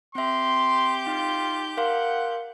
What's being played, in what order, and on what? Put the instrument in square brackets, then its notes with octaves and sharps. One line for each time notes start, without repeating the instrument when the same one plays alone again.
[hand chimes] C4 E5 [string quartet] G4 G6 [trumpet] C6
[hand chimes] D#4 [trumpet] F4
[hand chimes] A#4 F5 C6 [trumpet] F#5